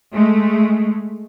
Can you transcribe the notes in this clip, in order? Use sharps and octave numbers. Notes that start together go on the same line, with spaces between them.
G#3 A3